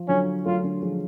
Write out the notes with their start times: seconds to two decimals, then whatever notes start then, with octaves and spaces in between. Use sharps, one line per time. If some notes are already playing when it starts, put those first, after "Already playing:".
Already playing: F3
0.08 D3 F#3 C#4
0.46 F#3 A3 F4
0.64 D3 F#3
0.82 F3 G#3